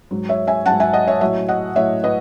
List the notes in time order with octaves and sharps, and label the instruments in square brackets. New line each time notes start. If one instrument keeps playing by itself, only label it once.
[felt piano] G#2 F#3
C#5 E5
E5 G#5
G#2 F#3 F#5 A5
E5 G#5
D#5 F#5
C#5 E5
A2 F#3 C#5 E5
D#5 F#5
A2 F#3 C#5 E5
B4 D#5